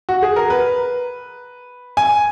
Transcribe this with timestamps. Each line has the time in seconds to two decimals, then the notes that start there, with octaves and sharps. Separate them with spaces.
0.09 F#4
0.22 G#4
0.36 A#4
0.50 B4
1.97 G#5